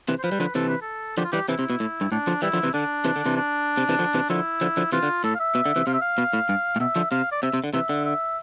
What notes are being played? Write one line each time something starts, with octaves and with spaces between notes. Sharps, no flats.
C3 E3
C5
F3 B4
G3
D3 F3
C3 E3 A4
B4
A4
D3 F3 G4
F4
E3 G3 G4
C3 E3 E4
C3
B2
A2
G2
A2 D4
D3 F3
E3 G3 E4
D3 F3
C3 E3
D3 D4
C3 E3
D3
C3 E3
D4
C3
C3 E3
D3 F3
C3 E3
D3 F3 E4
D3 F3
D3 F3
C3 E3 F4
D3
A2 A4
F5
E5
B2
D3
C3 E3
C3 F5
E5
F5
B2
A2
G2
A2
B2 E5
D3 F3
C3 F5
D5
C3 E5
C3
D3
C3 E3 E5
D3
E5